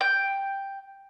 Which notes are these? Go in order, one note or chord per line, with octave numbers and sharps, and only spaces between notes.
G5